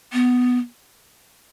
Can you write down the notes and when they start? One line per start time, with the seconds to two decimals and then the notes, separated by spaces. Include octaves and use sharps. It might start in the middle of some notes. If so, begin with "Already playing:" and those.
0.13 B3